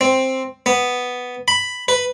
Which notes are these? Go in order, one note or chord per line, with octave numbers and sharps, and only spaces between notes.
C4
B3
B5
B4